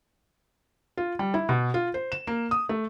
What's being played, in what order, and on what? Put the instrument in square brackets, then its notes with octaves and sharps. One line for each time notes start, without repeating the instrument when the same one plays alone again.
[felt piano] F4
G3
E4
B2
F4
C5
E7
A#3
D#6
A3